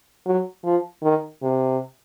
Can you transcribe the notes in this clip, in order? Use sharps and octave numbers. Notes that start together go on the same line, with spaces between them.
F#3
F3
D#3
C3